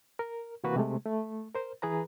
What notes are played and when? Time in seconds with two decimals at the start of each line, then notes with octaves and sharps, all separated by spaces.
0.19 A#4
0.64 C3 E3 A#3 F#4 B4
0.76 C3 G#3 A3
1.06 A3
1.55 A#4 C5
1.82 E3 G#4 B4 A#5